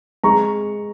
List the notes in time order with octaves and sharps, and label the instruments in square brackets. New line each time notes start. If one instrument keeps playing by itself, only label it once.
[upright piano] G#3 A#5 C#6